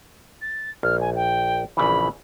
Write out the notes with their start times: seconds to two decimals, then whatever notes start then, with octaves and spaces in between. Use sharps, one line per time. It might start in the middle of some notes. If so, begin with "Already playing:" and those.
0.41 A6
0.83 A#1 F6
1.01 G#5
1.15 G5
1.77 A#1 C#3 E3 B5